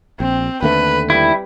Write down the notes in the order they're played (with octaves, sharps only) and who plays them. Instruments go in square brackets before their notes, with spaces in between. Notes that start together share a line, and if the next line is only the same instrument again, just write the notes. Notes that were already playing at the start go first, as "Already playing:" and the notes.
[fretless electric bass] A#1 [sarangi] C4
[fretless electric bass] D#2 D3 A3 [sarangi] B4
[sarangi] G3 [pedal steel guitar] E4